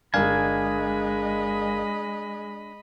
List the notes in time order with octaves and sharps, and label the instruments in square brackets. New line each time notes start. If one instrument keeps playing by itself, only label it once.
[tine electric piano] G1 A#4 F5 [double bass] G#3 [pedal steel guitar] D4 G#5 [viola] D#5 B5